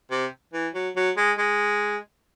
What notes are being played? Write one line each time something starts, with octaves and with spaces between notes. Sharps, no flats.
C3
E3
F#3
F#3
G#3
G#3